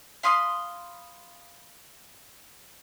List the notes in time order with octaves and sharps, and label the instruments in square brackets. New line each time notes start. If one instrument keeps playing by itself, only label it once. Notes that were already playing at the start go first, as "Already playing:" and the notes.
[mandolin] F5 B5 C6 D#6